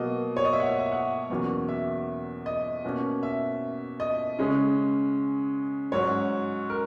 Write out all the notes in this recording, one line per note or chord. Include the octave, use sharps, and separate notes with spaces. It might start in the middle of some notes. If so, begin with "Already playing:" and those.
Already playing: B2 F#3 A#3 D#5
C#5
D#5
E5
F#5
E5
E5
F#5
E2 B2 F#3 A#3 C#4
E5
D#5
B2 A#3 C#4
E5
D#5
C#3 G#3 C#4
G#2 F#3 C#4 C#5
A#4